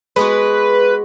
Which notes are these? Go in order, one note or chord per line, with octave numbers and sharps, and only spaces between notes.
G#3 B3 F#4 B4